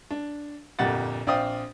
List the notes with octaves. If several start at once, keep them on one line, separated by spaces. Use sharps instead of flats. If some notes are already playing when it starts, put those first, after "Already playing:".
D4
G1 F2 A#2 G4 F#5 A6
A#1 C4 D5 F5 G5 D#6